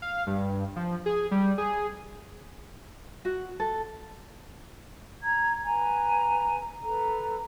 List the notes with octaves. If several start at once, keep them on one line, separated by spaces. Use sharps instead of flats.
F5
G2
F3
G#4
G3
G#4
F#4
A4
A#5 G#6
B4 G#5 A#5
A4 B4 A#5